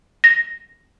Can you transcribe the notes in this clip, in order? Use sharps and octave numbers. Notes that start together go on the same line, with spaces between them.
A#6